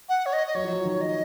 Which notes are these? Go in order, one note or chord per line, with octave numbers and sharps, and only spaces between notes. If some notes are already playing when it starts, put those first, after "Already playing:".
F#5
C#5
D#5
D#5
F#3 C#5
F3
F#3
D#3
D#5